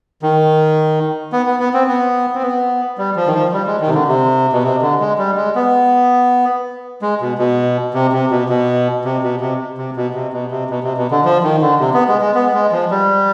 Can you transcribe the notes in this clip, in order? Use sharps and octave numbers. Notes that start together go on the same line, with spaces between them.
D#3
B3
B3
B3
C4
B3
C4
B3
G3
F3
D#3
F3
G3
G#3
D#3
C3
D3
C3
B2
C3
D3
G#3
G3
G#3
B3
G#3
B2
B2
C3
C3
B2
B2
C3
B2
C3
C3
B2
C3
B2
C3
B2
C3
B2
D3
F3
D#3
D3
C3
B3
G#3
G#3
B3
G#3
F3
G3